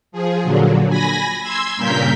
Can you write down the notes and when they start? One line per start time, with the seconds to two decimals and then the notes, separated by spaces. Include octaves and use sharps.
0.12 F3 G#4
0.42 A#2 D3 F#3
0.88 G#5 B5 A#6
1.41 C6 E6 G#6
1.76 G2 A#2 C#3 A#4 G6 B6